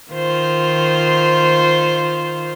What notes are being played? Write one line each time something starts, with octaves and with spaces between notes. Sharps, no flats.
D#3 F4 C5